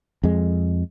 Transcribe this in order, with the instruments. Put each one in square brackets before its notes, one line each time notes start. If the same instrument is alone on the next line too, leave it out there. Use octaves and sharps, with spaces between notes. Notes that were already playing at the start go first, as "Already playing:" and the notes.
[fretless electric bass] F2 G#3